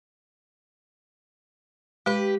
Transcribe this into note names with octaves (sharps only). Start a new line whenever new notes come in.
G#3 G4 B4